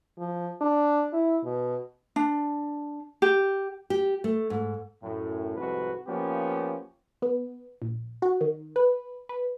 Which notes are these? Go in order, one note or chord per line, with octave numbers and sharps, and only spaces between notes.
F3
D4
E4
B2
D4
G4
G4
A3
G#2
F#2 A2
C2 F2 G#2 F#4 B4
F3 A#3 B3 C#4 G4
B3
A#1
F#4
D#3
B4
B4